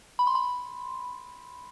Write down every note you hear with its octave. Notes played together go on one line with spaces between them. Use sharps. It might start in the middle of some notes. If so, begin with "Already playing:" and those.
B5
C6
B5